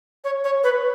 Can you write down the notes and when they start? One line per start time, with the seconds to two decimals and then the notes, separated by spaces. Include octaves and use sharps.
0.24 C#5
0.44 C#5
0.64 B4